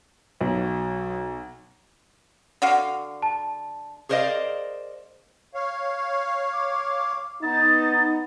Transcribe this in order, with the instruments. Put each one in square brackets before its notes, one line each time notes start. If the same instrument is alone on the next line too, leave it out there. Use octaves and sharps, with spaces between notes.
[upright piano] B1 [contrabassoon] F#3
[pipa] D3 F#4 F5
[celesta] A5
[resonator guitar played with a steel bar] G#4 A#4 C5 D5 D#5 F5
[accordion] C#5 F5
[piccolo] D6
[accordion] B3 [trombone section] D#4 [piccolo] A6